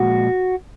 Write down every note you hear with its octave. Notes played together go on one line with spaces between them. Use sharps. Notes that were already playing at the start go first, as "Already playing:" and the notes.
Already playing: A#2 F3 G#3 F#4